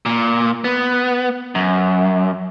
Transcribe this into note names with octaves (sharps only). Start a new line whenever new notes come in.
A#2
B3
F#2